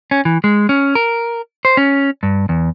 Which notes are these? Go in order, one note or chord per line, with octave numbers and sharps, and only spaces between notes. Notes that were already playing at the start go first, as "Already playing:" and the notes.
C#4
E3
G#3
C#4
A#4
C5
C#4
G2
E2